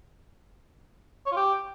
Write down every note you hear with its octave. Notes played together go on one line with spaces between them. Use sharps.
C#5
F4
G4